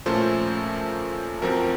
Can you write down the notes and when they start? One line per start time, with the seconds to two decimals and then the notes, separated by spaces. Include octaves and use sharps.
0.06 A#2 F3 A3 C#4 A4 C5
1.42 F#2 F3 C4 F#4 A#4